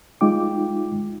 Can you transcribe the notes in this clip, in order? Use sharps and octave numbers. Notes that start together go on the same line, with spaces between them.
G#3 D#4 F4 G5 D6